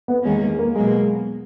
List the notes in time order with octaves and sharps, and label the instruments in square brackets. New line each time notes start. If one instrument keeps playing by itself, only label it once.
[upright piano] B3
[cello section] E2 D#3 A#3 C#4 [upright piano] G#3
[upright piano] G#3
A#3
[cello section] B2 F#3 A#3 [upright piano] G#3